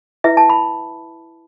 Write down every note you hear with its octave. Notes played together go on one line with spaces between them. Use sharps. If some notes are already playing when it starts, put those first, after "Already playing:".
E4 B4 E5
A5
B5